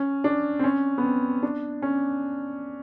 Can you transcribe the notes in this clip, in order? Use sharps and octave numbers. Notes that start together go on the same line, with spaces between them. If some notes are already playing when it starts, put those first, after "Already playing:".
Already playing: C#4
D4
C4
C#4
B3
C4
D4
C#4